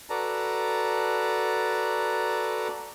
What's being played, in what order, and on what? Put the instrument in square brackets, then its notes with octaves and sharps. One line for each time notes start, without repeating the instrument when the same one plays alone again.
[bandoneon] F#4 A4 B4 D5 A5 A#5